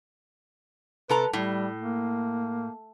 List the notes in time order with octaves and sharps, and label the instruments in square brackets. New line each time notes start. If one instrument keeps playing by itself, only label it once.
[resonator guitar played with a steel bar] C3 A4 A#5 [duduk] B4
[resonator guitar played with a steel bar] A2 [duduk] G3
[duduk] A#3